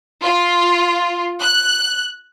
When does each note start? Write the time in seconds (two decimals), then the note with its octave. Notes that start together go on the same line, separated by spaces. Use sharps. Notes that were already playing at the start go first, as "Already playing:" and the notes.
0.23 F4
1.41 F#6